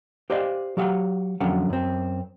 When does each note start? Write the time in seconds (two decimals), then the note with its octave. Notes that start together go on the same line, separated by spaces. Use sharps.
0.30 G4 C5 D5 D#5 F5
0.77 F#3 G4 F5 F#5
1.40 F2 D3 F#3 C#4 F5 F#5
1.70 F#2 C4